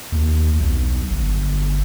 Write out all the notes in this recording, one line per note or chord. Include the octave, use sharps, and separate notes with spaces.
D#2
B1
G1